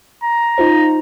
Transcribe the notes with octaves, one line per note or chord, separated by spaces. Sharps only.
A#5
D#4 F4 C5